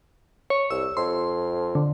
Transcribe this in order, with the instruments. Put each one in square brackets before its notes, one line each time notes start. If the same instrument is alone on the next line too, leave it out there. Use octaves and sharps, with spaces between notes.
[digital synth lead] C#5
[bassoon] C2 [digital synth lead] E6
[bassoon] F2 [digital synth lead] C6
[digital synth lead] D3